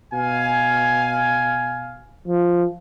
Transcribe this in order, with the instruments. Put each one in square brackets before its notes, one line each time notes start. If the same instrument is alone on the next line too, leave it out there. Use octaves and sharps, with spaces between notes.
[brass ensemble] B2 F5 G#5
[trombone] F3